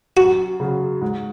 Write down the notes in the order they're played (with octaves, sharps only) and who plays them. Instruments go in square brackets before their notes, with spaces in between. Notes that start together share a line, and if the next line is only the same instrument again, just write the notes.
[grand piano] F#2 [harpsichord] F#4
[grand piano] C#3 F#3
G#2